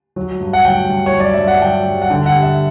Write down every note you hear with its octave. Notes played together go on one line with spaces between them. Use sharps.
F#3
G2
F#5
F#3 G5
G2
C#5
F#3
D5
G2 E5
F#5
F#3 G5
G2
F#5
D3 G5
F#5
G3
E5